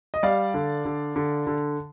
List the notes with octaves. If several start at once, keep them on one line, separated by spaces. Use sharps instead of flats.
D#5
G3 D5 F5
D3
D3
D3
D3